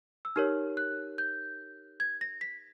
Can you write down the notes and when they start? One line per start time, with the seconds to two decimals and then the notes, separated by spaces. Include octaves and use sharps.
0.25 E6
0.36 D#4 G4 A#4 C#5 F6
0.77 F#6
1.18 G6
2.00 G#6
2.21 A#6
2.41 B6